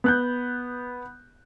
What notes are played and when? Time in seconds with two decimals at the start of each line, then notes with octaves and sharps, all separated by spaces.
0.04 B3 F#6 G6